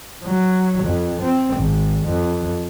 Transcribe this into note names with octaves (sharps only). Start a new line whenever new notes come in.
F#3
F2
C4
G#1
F2